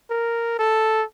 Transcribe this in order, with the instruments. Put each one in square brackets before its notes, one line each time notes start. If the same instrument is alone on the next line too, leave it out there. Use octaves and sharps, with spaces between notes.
[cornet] A#4
A4